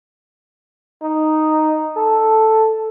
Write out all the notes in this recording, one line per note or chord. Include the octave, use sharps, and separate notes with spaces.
D#4
A4